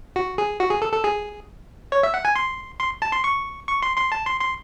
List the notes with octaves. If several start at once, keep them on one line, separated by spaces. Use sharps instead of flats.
F#4
G#4
F#4
G#4
A4
A4
G#4
C#5
E5
F#5
G#5
C6
C6
A5
C6
C#6
C#6
C6
C6
A5
C6
C6